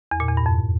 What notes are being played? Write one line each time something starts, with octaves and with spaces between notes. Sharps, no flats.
E2
A#2
E2
G2
F2